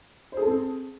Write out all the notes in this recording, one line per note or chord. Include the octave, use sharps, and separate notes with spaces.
C4 G#4 A4 C5